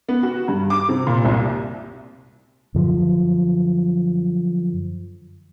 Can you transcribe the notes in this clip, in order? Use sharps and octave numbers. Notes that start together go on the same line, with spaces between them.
B3
F#4
G2
D6
C3
A#2
C2
F#2 D3 F3